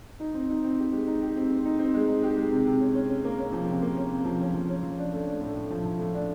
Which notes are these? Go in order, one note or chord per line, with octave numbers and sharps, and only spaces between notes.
D#4
C4
D#4
C4
G4
G#3
D#4
G4
C4
C4
D#4
C4
G#3
D#4
G4
G#3
C3
C3
C#4
C#4
C#4
A#3
C#4
F3
C3
A#3
C#4
C3
F3
C#4
F3
C#4
F3
D4
A3
D4
A2
A2
F3
F3
A2
D4